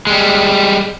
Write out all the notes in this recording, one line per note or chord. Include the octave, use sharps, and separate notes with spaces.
G3 G#3